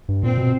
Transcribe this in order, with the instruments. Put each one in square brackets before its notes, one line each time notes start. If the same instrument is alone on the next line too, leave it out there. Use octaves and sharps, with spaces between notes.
[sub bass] G2
[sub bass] A#2 [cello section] C4
[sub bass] B2